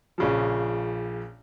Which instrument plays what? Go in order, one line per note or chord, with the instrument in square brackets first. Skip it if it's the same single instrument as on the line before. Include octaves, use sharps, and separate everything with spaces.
[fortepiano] A#1 C#3 F3